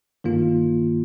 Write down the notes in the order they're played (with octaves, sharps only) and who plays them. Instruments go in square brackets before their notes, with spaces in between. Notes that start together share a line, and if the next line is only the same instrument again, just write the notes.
[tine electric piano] G2 D#3 A#3 F4